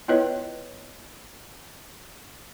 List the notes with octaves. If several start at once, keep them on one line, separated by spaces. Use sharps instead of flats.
B3 E4 F4 B4 C#5 D#5